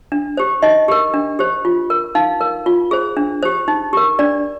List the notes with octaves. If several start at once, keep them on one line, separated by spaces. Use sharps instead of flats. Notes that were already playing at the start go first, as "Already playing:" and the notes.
D4
G4 C5
D#4 D#5
G4 A#4
D4
G4 C5
F4
A#4
D#4 F5
A#4
F4
G#4 C5
D4
G4 C5
D#4
G4 A#4
D4 D5